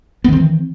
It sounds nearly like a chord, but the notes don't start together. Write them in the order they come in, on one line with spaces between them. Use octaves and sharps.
B3 D#3 C4 E3